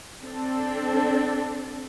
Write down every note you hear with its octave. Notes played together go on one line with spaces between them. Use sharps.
C4 D4 A4